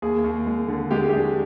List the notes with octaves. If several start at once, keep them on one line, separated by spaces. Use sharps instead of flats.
D#2 G#4
D#2
G#3
D3
G#3 G4
G4
D4 G#4